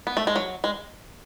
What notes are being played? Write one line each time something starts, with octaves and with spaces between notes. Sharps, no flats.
B3
A3
G#3
F#3
G#3